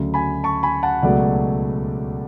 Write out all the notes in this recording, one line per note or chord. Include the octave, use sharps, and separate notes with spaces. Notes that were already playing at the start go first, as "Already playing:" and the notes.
Already playing: D2 C#3 F#3
G#5 B5
A5 C#6
G#5 B5
F#5 A5
C#2 B2 F#3 A3 D5 F#5